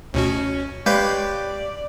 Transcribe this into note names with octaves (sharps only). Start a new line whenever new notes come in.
D2 B2 C#4 F#4
G#3 G4 B4 C#5 D5 F5 G6